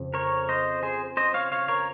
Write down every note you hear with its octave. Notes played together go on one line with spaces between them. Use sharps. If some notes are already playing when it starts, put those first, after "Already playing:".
Already playing: F2 C#3
A#4 C#5
C5 D#5
G#4 C5
C5 D#5
C#5 F5
C#5 F5
A#4 C#5